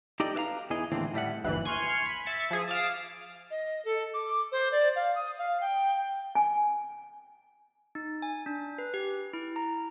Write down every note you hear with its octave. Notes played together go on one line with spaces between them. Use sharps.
D#4 G4 A4 D5 D#5 G5
B4 E5 F5 A#5
E2 E3 G#4 D#5
D#2 A2 D3 E3 C4
A2 G3 E5 F#5
G1 D#2 E3 F#6
G#5 C6 C#6 F6
B5 B6
E5 A6 C#7
F3 G#4
F5 D6 D#6 A6 E7
D#5
A4
D6
C5
D5
F5
D#6
F5
G5
G#5
D#4
G#5
D4
B4
G4
E4
A#5